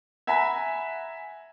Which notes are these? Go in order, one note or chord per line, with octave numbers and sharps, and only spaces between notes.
E5 F#5 G#5 A#5 B5 B6